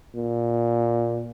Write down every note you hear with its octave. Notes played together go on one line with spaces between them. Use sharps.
A#2